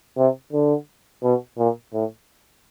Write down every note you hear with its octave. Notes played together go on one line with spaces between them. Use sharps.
C3
D3
B2
A#2
A2